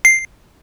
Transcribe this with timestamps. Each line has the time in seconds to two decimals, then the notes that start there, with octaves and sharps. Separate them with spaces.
0.05 C7